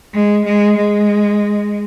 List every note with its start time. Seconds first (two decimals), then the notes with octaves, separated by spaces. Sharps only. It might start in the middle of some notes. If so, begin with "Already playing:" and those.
0.14 G#3
0.45 G#3
0.77 G#3